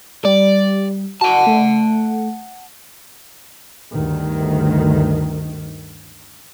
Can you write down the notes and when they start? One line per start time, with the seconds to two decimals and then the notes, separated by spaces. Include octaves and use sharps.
0.25 G3 D5
1.21 F#4 F#5 A5
1.47 A3
3.92 D2 G2 D#3